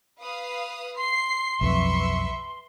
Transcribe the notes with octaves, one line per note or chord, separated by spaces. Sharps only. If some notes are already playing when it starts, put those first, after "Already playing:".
B4 F5 D#6
C6 C7
B1 F2 B4 E5 C#6